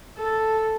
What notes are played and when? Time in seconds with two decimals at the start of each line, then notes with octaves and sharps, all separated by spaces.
0.18 A4